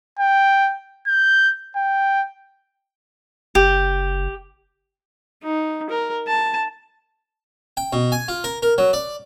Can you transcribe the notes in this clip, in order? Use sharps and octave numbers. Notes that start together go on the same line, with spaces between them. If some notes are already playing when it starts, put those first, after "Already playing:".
G5
G6
G5
F#1 G4
D#4
A#4
A5
G5
B2
G#5
F4
A#4
A#4
F#3
D5